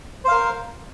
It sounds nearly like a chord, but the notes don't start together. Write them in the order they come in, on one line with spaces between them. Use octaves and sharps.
C5 F5 A#4